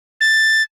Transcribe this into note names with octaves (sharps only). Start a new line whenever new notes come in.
A6